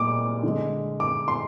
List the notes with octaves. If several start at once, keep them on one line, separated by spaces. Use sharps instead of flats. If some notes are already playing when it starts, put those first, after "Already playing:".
Already playing: A#2 G#3 D6
D3 G#3
D6
C6